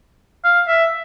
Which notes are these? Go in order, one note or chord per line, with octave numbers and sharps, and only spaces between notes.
F5
E5